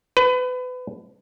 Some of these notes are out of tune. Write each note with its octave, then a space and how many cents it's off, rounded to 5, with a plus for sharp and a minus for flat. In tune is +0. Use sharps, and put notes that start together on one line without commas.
B4 +30